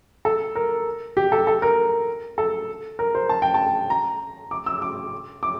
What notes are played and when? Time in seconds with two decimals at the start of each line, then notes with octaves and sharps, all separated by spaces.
0.25 A4
0.55 A#4
1.17 G4
1.32 A4
1.47 A4
1.62 A#4
2.38 A4
2.99 A#4
3.15 C5
3.29 A5
3.42 G5
3.54 A5
3.90 A#5
4.51 D6
4.66 E6
4.82 D6
5.43 D6